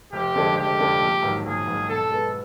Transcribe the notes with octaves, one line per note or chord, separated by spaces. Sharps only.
F1 G4
F2 D3 F3 G#3
F1 G4
F2 D3 F3 G#3
A#1
G#2 D#3 F#3
A#1 G#4
G#2 D#3 F#3
B2 A4
G#3 B3